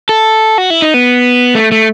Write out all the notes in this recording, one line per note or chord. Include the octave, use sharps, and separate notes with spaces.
A4
F#4
E4
D#4
B3
A3
A3